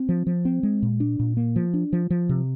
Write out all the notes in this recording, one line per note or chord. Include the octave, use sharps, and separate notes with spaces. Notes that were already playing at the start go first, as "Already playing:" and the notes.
Already playing: C4
F3
F3
C4
G#3
A#2
D4
A#2
A#3
F3
D4
F3
F3
C3